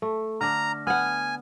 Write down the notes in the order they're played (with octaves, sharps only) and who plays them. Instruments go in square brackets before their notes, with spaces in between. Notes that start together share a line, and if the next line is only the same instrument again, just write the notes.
[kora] A3 [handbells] A4
[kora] D3 D4 [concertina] A#5 [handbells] F6 A#6
[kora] B3 F#5 [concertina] G#5 [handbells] F6